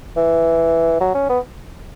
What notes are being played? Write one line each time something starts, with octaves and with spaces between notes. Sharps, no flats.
E3
F#3
C#4
B3